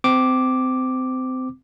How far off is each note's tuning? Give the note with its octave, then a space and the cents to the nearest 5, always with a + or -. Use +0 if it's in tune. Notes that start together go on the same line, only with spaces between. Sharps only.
C4 -25 D6 +0